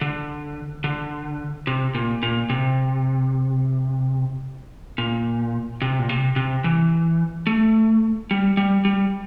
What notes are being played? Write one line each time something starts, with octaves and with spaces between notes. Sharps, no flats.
D3
D3
C3
A#2
A#2
C3
A#2
C3
A#2
C3
C3
E3
A3
G3
G3
G3